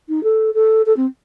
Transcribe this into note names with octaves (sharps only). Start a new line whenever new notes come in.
D#4
A4
A4
A4
C4